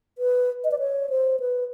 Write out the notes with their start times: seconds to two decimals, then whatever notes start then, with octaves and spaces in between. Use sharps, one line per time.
0.18 B4
0.64 D#5
0.71 D5
0.79 C#5
1.10 C5
1.40 B4